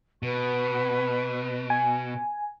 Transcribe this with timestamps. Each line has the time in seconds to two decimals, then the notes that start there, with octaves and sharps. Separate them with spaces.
0.23 B2 B4 C#6
1.70 G#5